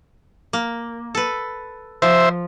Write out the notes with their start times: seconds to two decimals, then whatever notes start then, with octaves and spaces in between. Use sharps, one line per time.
0.53 A#3
1.15 A4 B4
2.02 F3 C5 E5